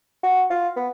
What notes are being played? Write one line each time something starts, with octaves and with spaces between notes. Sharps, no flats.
F#4
F4
B3